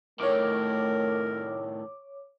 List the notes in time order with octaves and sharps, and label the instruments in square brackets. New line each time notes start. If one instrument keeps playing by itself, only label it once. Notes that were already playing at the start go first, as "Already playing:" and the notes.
[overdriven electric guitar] A2 D#3 [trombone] A3 [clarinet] A#4 [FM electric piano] C#5 D6